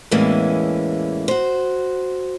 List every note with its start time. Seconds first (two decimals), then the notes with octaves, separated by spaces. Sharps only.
0.11 E2 A2 E3 G#3 A#3 C#4
1.28 F#4 C5